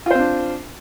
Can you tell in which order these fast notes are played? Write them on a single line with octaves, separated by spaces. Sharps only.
F4 C5 C4 D4